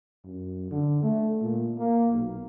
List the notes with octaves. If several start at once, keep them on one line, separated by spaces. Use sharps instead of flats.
F#2
D3
A3
A#2
A#3
B1